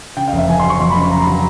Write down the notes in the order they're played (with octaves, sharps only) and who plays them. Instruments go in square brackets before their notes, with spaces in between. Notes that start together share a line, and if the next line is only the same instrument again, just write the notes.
[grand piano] C#3 G5
F5
F1 E5
F2 G#5
C6
F#3
C#6
F2 C6
B5
C#3
F1 A#5
B5
F#3
A#5